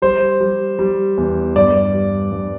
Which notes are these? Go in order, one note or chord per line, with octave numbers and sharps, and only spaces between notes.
G3 C5
G3
G3
E2
G2 D5
G3
G2